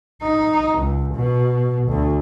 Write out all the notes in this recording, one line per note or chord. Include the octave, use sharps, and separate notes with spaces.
D#4
C#2
B2
D2